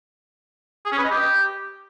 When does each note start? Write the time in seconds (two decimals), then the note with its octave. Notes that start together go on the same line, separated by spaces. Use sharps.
0.85 G#4
0.92 C#4
0.98 B4
1.05 D#5
1.11 G4